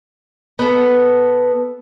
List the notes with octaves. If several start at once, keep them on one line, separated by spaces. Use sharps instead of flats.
B3 A4